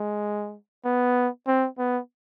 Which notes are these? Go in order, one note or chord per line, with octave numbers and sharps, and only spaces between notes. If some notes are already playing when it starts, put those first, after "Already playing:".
Already playing: G#3
B3
C4
B3